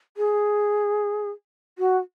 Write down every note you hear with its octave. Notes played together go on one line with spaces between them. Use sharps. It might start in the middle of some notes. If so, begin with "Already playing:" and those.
G#4
F#4